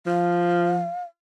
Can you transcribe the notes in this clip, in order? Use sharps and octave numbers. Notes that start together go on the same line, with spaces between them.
F3 F5